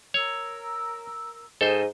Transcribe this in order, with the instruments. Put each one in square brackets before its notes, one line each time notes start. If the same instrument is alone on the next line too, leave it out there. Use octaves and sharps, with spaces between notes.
[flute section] A#4 E6 [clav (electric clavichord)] C#5
[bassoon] G#2 [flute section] G#4 D#5 [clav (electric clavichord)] A4 C5